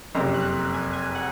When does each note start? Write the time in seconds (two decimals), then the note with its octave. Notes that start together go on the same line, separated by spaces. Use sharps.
0.15 F#1 F2 C3 A#5
0.34 F#6
0.73 G#5
0.93 G#5
1.14 F#5